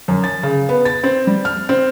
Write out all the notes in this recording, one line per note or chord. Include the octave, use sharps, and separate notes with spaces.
F#2
A6
C#3
B3
A6
C4
G3
F6
C4